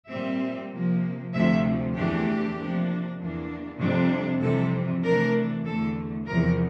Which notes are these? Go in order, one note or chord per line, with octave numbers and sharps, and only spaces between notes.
A#2 G3 C4 E5
C3 F3 A#3
D2 C3 F3 A3 E5
E2 E3 A3 D4 G4
C3 F3 A#3 D4
E2 E3 A#3 D4
F2 C3 G3 D4
F2 C3 E3 G3 A4
C3 E3 A3 D4 A#4
E2 D3 A3 A4
E2 C3 F3 A#4